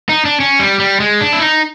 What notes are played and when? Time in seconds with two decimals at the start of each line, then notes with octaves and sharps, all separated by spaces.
0.09 D#4
0.25 D4
0.40 C#4
0.59 G3
0.80 G3
1.00 G#3
1.21 D4
1.33 E4
1.41 D#4